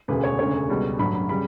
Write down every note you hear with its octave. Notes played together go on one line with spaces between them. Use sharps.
E1 D2 C#3 B4
C#5
E1 D2 C#3 C#5
C#2 B2 G3
A1 G2 F#3 B5
B5
C#3 G3 B5